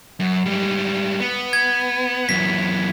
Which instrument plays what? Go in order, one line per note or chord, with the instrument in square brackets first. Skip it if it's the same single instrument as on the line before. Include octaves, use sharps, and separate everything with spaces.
[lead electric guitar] F#2
G#2 G3
B3
[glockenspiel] G#6
[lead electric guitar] F#2 E3 [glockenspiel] B6